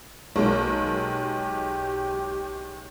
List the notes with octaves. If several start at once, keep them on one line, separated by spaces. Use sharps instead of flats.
B1 G#3 A#3
G4